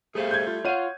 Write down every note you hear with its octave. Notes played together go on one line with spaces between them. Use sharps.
G3 A3 G#4 C5 F5
G6 G#6
F4
F4 C#5 F5 F#5 D#7